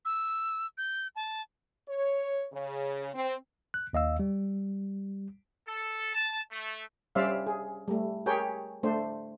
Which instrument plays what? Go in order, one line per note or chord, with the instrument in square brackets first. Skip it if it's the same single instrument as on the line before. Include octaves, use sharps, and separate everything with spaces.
[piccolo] E6
G6
A5
[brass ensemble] C#5
C#3
C4
[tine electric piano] F#6
D#2 D#5 F5 E6
G3
[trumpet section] A4
A5
A3
[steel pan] G3 C#4 C5 D5 E5 F5
G#4
G3 A3
G4 G#4 A#4 C#5 G5
A3 D4 C5